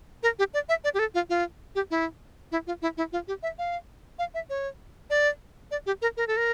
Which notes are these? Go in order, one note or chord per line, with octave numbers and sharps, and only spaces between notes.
A#4
G4
D5
E5
D5
G4
A4
F4
F4
G4
E4
E4
F4
E4
E4
F4
G4
E5
F5
F5
E5
C#5
D5
D5
G4
A#4
A#4
A4
A#4